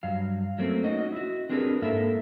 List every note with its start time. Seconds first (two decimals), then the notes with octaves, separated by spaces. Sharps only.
0.03 G2 F#3 G3 F5
0.58 F#3 A3 A#3 C4 C#4
0.84 C#4 D#4 F#4 D#5
1.12 E4 F#4
1.49 C4 D4 G4 G#4 A#4 B4
1.82 G#2 A#3 E4 A4 A#4 E5